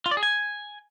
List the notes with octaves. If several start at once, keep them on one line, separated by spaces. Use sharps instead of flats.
F4
D5
G#4
G#5